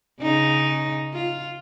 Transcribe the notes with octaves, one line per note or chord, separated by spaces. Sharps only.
C#3 D#4
F4